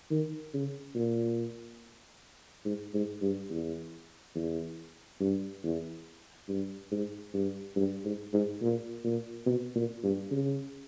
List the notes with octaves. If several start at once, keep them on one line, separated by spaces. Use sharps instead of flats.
D#3
C#3
A#2
G#2
G#2
G2
E2
E2
G2
E2
G2
G#2
G2
G2
G#2
G#2
A#2
A#2
B2
A#2
G2
C#3